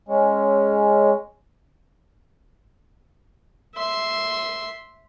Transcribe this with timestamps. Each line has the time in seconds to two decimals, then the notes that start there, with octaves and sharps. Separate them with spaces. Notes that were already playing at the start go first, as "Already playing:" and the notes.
0.09 G#3 C#4
3.76 E5 C6